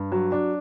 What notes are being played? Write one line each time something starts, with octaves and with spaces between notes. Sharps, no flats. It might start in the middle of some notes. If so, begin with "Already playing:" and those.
Already playing: G2
F#3
D4